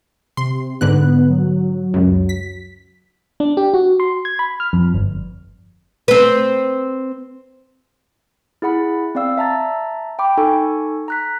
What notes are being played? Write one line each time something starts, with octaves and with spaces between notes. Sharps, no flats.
C3 C6
G#2 D3 B3 F#6
F#3
C#2 F#2
B6
D4
G4
F#4
C6
G#6
B5
F6
F2
G1
C4 B4
E4 G#4 F#5 B5
C4 D5 F5 E6
E5 A5 A#5 A6
G5 B5 D6
D#4 A4 G#5 C#6
A#5 F#6 B6